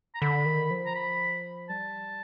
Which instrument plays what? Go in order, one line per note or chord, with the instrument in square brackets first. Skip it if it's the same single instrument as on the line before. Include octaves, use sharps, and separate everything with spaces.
[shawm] A#5
[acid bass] D3 [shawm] B5
[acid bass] D#3
F3
[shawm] A#5
B5
[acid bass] G3 [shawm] A5